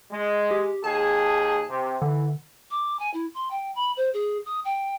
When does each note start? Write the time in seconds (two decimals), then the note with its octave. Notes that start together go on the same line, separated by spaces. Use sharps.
0.11 G#3
0.51 G4
0.84 D#2 G#4 A5
1.69 C3
2.02 D3 E3
2.71 D6
2.99 G#5
3.14 E4
3.34 C6
3.51 G5
3.75 B5
3.97 C5
4.14 G#4
4.46 D#6
4.65 G5